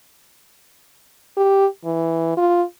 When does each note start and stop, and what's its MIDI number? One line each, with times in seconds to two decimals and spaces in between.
1.37 1.66 67
1.85 2.34 52
2.37 2.63 65